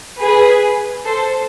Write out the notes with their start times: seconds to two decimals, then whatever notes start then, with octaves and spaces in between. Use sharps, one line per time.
0.20 G#4 B4
1.05 A4 C5